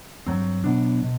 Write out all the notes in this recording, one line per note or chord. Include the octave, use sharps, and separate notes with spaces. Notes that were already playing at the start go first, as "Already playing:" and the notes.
G2 F#3 C4
B2 F#3 B3 D4
B2